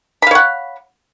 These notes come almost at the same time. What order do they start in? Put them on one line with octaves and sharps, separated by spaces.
B5 F5 C#5 F#5